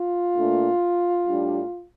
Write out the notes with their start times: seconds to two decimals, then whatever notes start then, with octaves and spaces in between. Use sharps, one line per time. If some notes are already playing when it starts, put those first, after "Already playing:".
Already playing: F4
0.37 A#2 A3 D4
1.30 A2 G3 D4